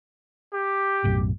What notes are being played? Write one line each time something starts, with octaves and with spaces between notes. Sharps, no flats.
G4
B1 F#2 A2